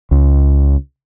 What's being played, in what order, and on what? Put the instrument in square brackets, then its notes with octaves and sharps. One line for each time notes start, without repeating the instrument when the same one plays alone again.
[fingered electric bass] C#2